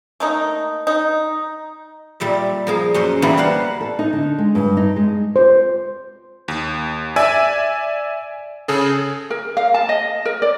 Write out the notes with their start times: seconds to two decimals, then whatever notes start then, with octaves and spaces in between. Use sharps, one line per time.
0.20 A3 A#3 D#4
0.87 D#4
2.20 A#2 G3 D5 E5
2.67 F3 A#3 G#4
2.94 F#2 C#4 C5 C6
3.22 E3 G3 A#3 B3 D4 E4
3.37 A#4 C5 F5 F#5
3.81 A4
3.99 D#4
4.13 D3
4.38 G#3
4.55 G2
4.77 D#4
4.96 G#3
5.36 C5
6.48 D#2
7.16 D5 E5 G#5 E6 G#6
8.68 C#3 G#4 A4
9.30 A#4
9.57 F5
9.74 A5
9.89 D#5
10.25 A#4
10.42 D5